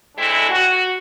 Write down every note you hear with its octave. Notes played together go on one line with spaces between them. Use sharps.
G#3 A3 C4 D4 E4
F#4